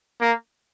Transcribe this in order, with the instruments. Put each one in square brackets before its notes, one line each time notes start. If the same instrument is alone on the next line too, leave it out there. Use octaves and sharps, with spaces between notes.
[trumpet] A#3